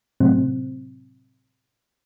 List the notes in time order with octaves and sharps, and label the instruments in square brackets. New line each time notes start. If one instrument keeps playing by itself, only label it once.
[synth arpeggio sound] A2 C3 F#3 C4